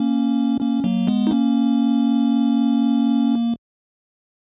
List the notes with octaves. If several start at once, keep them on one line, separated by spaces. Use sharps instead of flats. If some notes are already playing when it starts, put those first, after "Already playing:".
Already playing: A#3 C#4
A#3 C#4
F#3 A#3
G#3 B3
D#4
A#3 C#4